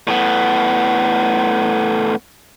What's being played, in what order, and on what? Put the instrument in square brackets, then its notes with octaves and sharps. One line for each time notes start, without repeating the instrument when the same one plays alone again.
[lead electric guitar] A2 B3